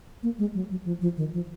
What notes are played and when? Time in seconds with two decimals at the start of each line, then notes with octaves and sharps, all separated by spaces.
0.23 A#3
0.39 G#3
0.54 F#3
0.70 F#3
0.85 F3
1.01 F3
1.17 D#3
1.33 F3